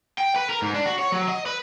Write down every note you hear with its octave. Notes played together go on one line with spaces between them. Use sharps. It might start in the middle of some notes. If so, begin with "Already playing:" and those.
G5
B4
A#4
G#2
D4
F#4
C#5
F#3
D#5
B4